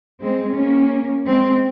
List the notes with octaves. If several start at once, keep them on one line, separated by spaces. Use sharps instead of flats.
G#3 C4
A#3 C#4
G#3 C4